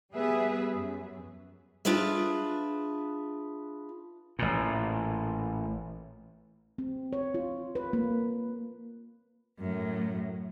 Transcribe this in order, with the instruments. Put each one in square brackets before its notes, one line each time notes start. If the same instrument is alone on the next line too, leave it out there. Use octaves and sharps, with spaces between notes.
[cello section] G3 B3 G#4 B4 E5
F#2
[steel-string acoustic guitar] D4 F4 G#4 B4 E5
[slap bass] A1 A#2
[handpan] C4
C#5
F4
B4
A#3
[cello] F#2 A2